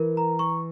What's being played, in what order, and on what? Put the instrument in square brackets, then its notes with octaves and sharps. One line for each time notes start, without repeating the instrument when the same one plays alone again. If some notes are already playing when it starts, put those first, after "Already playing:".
Already playing: [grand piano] E3 [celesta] A#4
[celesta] A#5
C#6